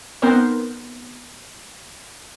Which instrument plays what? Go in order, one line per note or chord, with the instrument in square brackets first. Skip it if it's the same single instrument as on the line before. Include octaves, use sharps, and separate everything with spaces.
[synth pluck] B3 C4 D#4 A#4 C5